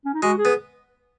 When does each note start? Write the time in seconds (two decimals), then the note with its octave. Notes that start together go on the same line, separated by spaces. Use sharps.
0.05 C#4
0.14 D#4
0.22 G#3 F#4
0.38 G#4
0.45 B3